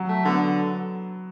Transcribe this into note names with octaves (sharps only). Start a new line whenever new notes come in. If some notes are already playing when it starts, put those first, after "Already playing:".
Already playing: F#3
A3
D3 B3